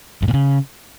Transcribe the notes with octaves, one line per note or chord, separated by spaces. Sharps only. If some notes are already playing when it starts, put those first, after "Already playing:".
G2
A#2
C#3